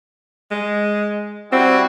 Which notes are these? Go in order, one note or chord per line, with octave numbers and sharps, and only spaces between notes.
G#3
G3 C4 E4 F#4